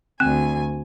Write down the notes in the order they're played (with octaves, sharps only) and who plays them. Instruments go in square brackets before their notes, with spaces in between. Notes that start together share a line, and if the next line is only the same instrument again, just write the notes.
[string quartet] D2 G#5 [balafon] C4